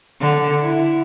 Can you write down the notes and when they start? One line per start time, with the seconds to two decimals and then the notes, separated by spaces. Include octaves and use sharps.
0.21 D3
0.62 E4